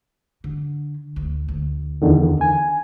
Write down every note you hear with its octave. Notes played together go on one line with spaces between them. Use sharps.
D3
D2
D2
E2 D3 D#3
G#5